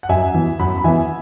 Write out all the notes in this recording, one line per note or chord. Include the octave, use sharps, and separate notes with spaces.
F#5
F#2 E5 G#5
E3 B3
F#2 F#5 B5
B5
E3 B3 E5 G#5